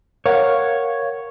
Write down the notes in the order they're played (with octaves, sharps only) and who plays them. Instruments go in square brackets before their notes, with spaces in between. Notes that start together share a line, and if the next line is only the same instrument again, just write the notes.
[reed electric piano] A#4 F5 F#5 [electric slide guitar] C#5